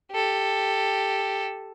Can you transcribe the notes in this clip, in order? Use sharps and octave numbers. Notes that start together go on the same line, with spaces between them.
G4 A4